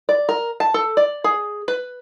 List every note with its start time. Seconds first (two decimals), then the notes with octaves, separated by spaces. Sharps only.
0.09 D5
0.29 A#4
0.60 A5
0.74 A4
0.97 D5
1.24 G#4
1.68 B4